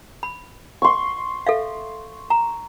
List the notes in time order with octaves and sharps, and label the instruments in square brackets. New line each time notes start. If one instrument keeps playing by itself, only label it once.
[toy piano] B5
[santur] C6 C#6
[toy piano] A4 E5 F5
A#5